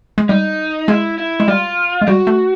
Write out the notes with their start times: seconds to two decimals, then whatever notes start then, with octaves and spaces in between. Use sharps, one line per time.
0.18 G#3
0.29 G3 D#4
0.88 G#3 E4
1.18 E4
1.40 G#3
1.48 G3 F4
2.02 G#3
2.07 G3 F#4
2.27 A3